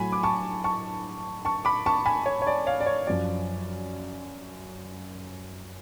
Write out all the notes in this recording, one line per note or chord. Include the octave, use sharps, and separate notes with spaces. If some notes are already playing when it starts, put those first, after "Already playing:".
Already playing: A2 F#3 G#5 B5
D6
A5 C#6
A5 C#6
A5 C#6
B5 D6
A5 C#6
G#5 B5
C#5
C#5
D5
C#5 F5
D5
C#5
F#2 F3 D5